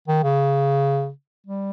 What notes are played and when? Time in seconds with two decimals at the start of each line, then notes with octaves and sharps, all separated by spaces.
0.08 D#3
0.23 C#3
1.47 G3